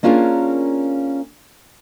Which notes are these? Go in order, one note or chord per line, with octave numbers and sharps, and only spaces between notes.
A#3 C#4 D4 F4 G#4 A#4